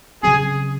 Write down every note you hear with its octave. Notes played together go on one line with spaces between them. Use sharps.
C#3 F#3 C4 G#4